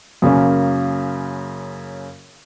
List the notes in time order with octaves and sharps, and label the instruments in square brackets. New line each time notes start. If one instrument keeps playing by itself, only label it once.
[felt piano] F#2 C#3 A#3 C#4